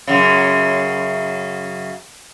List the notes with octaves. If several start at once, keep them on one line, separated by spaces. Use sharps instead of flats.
F#2 C#3